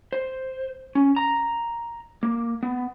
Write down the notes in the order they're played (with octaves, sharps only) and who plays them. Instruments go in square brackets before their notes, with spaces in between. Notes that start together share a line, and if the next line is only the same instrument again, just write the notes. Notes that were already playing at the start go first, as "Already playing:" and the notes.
[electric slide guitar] C5
C#4
A#5
A#3
B3